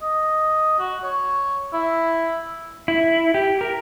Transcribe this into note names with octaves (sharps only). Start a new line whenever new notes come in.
D#5
F#4
C#5
E4
E4
G4
A#4